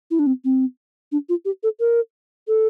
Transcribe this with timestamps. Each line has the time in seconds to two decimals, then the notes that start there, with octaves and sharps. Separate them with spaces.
0.11 E4
0.19 D4
0.27 C4
0.44 C4
1.12 D4
1.29 F4
1.45 G4
1.63 A4
1.80 A#4
2.48 A4